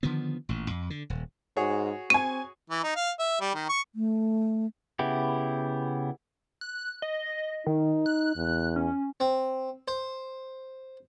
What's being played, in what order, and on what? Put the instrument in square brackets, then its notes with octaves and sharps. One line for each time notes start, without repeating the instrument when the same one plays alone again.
[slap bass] D3 D#3 F3 B3
A1 A#2
F2
D3
D#1
[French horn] G#2 [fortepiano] F#4 G#4 C#5
[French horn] C4 [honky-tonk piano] G#5 C#6 [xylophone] D#7
[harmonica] E3
D#4
F5
E5
G3
D#3
C#6
[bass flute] A3
[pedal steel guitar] C#3 B3 E4 G4
[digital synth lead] F#6
D#5
[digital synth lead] D#3 [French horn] D#4
[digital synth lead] F#6
[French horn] E2
[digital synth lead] C#4
[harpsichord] C4
C5